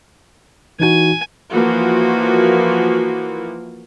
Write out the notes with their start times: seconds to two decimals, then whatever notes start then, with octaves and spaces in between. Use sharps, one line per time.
0.80 E3 D#4 F#4 G#5
1.52 E3 F3 A#3 F#4